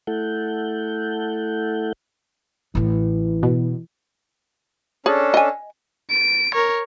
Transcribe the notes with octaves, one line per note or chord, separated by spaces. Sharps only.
A3 E4 A4 F#5 G6
A1 A2 E3
B2
C#4 D4 G#4 A4
D#5 G#5
D7
A#4 C#5